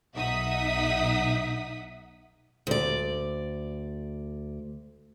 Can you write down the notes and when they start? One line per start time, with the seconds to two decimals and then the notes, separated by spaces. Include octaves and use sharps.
0.14 B1 D#4 E5 F#5 D#6 B6
2.67 D2 D5